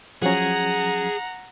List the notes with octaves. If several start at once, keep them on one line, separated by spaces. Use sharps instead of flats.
F3 F#3 C#4 G#4 F#5 A#5